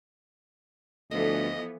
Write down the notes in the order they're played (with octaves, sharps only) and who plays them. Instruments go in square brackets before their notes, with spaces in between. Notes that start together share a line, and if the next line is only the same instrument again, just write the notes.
[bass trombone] D2 [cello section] E3 F3 B3 [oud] A4 [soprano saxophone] D#5